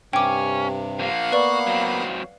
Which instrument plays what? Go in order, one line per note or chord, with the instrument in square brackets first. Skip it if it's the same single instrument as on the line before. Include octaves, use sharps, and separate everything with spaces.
[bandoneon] G2 C3 [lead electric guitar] C#4 [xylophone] G5 D6
[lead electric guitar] F3 A#3 [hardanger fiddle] F5 F#5
[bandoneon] A#3 B3 [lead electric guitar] F#4 [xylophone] B4 D5
[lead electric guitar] F#3 C4